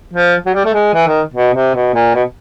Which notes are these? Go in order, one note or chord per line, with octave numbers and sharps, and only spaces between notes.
F3
F#3
G3
A3
G#3
E3
D#3
B2
C3
B2
A#2
B2